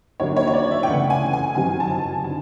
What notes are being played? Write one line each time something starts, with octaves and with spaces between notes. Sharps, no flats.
D#2 D3 F#3 A#3 D#4 C#5
C#5
C#5
D5
E5
G5
C#3 E3 A3 F#5
G#5
G#5
F#2 D#3 G3 C4 D#4 G#5
A5
G#5
D3 A5